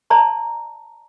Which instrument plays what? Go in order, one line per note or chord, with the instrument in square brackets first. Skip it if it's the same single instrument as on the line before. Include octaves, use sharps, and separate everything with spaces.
[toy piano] D5 A5 A#5 C6